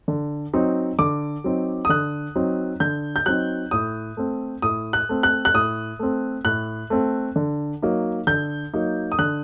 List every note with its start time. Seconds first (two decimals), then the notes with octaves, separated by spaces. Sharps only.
0.08 D3
0.53 F#3 C4 D#4
0.99 D3 D6
1.44 F#3 C4 D#4
1.85 D#6
1.89 D3 F#6
2.36 F#3 C4 D#4
2.80 D3 G6
3.16 G6
3.26 F#3 C4 D#4 F#6
3.71 A2 D#6
4.17 A3 C4
4.62 A2 D#6
4.93 F#6
5.09 A3 C4
5.23 F#6
5.45 F#6
5.54 A2 D#6
5.99 A3 C4
6.45 A2 F#6
6.90 A3 C4
7.36 D3
7.82 F#3 A#3 D#4
8.27 D3 G6
8.74 F#3 A#3 D#4
9.12 D#6
9.19 D3 F#6